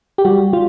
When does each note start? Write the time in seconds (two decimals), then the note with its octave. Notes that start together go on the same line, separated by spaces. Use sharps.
0.18 G4
0.25 G3 F#4
0.53 G3 F4